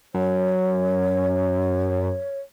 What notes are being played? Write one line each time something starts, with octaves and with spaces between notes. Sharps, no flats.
F#2 C#5